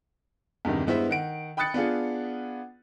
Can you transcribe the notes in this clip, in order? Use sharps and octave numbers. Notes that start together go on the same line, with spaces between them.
E2 G2 C3 D#3
G2 G#3 B3 E4 C5 E5
D#3 F#5 D7
G5 B5 D#6 F#6 A6 C#7
B3 D4 F4 G#4